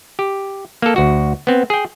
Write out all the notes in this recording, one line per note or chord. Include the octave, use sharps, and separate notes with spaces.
G4
A#3 A4
D2 F#4
B3 C4
G#4 G5